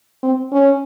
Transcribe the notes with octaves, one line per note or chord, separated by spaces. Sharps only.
C4
C#4